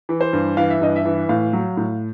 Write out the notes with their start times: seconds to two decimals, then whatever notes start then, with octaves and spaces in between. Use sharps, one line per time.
0.09 E3
0.21 C5
0.33 G2
0.57 E3 F5
0.70 E5
0.81 G2 D#5
0.96 E5
1.06 E3
1.29 A2 F5
1.53 F#3
1.77 A2